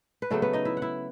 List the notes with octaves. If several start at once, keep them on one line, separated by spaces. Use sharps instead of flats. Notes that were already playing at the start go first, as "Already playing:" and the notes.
B4
C#3 F#3 A3 B3 A4
B3 B4
D#4 D#5
E4 E5
F#5
E4 E5